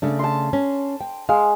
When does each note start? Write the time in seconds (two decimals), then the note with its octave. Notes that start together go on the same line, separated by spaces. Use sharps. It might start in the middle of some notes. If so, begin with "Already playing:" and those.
0.02 C#3 A3 D4
0.19 A5 C6
0.53 C#4
1.01 G5
1.29 G#3 F5